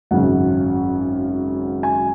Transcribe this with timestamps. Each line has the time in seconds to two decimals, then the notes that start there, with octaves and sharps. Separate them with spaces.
0.11 G#1 F#2 C#3 F#5
1.83 G#5